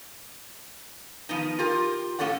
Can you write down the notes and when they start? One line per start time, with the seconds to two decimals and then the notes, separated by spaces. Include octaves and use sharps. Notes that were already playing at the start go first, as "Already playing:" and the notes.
1.29 D#3 F3 B3 D#4
1.59 F4 G4 A#4
2.19 A2 A#3 C#4 A4 C#5 F#5